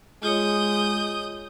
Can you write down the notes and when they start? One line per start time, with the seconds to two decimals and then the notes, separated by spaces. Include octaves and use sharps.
0.23 G#3 F4 C#5 D#6 G6